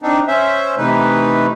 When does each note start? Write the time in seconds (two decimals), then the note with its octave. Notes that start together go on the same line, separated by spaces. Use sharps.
0.02 C4 D4 D#4
0.27 C#4 C5 E5
0.78 C3 E3 A3 D#4 B4